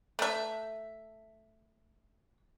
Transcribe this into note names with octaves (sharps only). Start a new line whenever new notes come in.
A3 E5